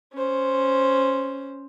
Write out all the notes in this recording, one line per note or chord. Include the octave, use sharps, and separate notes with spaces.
C#4 C5